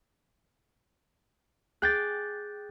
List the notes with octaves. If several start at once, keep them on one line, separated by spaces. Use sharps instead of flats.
G#4 G5 D6 F#6 G6 A6